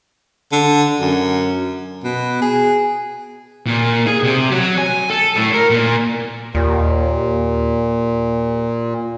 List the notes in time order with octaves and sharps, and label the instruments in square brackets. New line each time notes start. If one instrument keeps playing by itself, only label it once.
[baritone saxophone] D3
F#2
B2
G#4
[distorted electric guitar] A#2
G#4
C3
F#3
G#5
A4
A2
A#4
A#2
[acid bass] D#2 [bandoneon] A#2